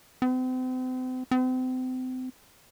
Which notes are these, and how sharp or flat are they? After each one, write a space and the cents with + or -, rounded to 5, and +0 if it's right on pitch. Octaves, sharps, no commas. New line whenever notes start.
C4 -40
C4 -35